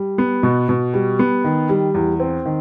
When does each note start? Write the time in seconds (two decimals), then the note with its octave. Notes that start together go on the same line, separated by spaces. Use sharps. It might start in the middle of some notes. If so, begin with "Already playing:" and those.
Already playing: G3
0.18 B3
0.43 B2
0.69 B2
0.94 G3
1.19 B3
1.44 D#3
1.69 G3
1.94 E2
2.20 C4
2.45 D#3